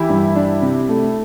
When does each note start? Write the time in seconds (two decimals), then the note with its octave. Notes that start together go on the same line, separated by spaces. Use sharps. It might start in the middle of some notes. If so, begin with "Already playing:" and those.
Already playing: E3 E4 G4
0.10 G2
0.36 D4
0.62 C3
0.89 A3